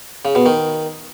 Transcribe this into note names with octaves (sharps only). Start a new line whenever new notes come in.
C#3
B2
D#3